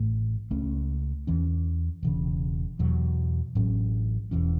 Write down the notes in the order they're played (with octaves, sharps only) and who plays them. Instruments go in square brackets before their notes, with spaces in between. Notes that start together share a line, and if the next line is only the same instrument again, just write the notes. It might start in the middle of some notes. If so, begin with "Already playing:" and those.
Already playing: [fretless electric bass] A1 A2 A3
C#2 C#3 A3 C#4
E2 E3 C#4
E1 E2 C#3
E2 B2 F#3
A1 A2 F#3 C#4
E1 E2 E3 C#4